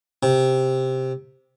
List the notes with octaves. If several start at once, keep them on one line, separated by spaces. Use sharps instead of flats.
C3